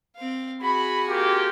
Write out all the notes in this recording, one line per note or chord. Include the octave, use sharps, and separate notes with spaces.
C4 F5
F#4 G#4 B5
A#3 F4 G4